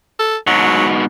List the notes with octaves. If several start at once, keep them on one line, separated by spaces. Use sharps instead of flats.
A4
G#2 B2 F#3